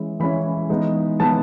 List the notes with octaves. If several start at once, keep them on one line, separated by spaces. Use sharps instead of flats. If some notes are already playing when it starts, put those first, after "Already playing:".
Already playing: E3 G#3 C#4 E4
E3 G#3 C#4 E4 B5
E3 G#3 B3 D#4
E3 G#3 B3 D#4 A5